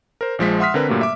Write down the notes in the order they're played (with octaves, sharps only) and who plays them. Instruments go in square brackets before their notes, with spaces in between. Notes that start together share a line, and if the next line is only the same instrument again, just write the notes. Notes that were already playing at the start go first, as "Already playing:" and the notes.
[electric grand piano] A#4 C5
A#1 F3 G#3 B6
E5 F#5 C6 D#6 F6 B6
D3 C4 A#4 B4
G2 A#2 F#3 G3 A3 A#3
E5 D6